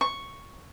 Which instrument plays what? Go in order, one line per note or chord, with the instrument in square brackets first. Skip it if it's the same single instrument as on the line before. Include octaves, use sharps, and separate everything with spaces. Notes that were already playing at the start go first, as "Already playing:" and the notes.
[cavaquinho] C#6